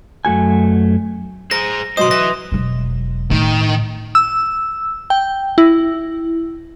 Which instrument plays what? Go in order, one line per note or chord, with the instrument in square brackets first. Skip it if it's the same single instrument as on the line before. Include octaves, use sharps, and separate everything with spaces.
[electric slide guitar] F#2 A3 F#4 G#5
[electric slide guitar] G#4 C5 A#5 [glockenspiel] A#6
[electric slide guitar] B2 C5 [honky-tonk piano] F#3 D#5 [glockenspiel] C6 D#6
[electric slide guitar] B4 E5 [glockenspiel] A#6
[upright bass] E1 F#3
[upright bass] A2 [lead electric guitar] D#3
[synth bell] E6
G5
E4